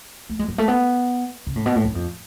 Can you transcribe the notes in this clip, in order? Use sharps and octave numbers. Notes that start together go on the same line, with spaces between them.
A3
G#3
F#3
A3
B3
C#3
A2
B2
A2
F#2
F2